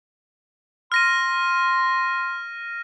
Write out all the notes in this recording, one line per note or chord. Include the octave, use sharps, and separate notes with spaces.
C6 F6 A#6 D#7